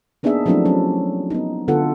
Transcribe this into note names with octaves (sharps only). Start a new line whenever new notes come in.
A#3 B3 D4 D#4 G#4 E5
F3 F#3 A3 C4 D4 E4
F#3 C#4
B3 D#4
D3 B3 F4 A4 F#5